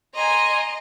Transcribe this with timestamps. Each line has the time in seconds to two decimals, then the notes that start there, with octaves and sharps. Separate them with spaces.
0.15 D#5 G#5 A#5 C6